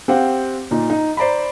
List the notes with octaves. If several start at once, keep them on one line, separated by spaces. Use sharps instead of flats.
C4 G4 C5 F5 F#5
A#2 D#4
D#4
C5 D5 A#5 B5